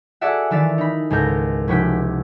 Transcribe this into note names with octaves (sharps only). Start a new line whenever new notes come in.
F#4 G#4 A4 D5 E5 F#5
D#3 E3 D5 E5 F5 A6
D#4 B5
C#2 G#2 A4 A#4 G6 A#6
F1 C#4 E4 F#4 G5 B6